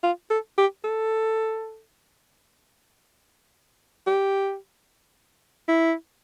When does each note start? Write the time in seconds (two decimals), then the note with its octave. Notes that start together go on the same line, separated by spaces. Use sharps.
0.03 F4
0.30 A4
0.58 G4
0.84 A4
4.07 G4
5.68 E4